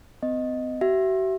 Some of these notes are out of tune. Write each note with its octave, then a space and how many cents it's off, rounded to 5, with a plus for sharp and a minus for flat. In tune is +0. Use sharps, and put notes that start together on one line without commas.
C4 -45 D#5 +0
F#4 +45 E5 +15